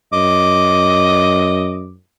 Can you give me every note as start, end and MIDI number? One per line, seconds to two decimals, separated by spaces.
0.13 1.95 42
0.13 1.82 75
0.13 1.91 86